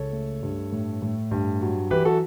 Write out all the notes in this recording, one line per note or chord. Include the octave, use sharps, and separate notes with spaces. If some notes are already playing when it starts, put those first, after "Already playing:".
Already playing: C#2 A4 C#5
A3
G2
A2
A2
G2
F#3
E3 G4 B4
F#4 A4